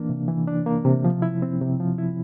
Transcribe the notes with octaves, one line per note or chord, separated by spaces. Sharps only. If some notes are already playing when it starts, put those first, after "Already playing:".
Already playing: E3 A#3 D4
C3
E3
D4
A#3
C3
F3
E4
C4
C3
F3
E4